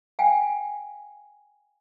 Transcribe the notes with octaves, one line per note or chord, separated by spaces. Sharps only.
F5 G5 G#5